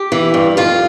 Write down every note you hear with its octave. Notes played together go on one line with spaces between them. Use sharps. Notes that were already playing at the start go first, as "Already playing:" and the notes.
Already playing: G4
E3
G2
F2 F4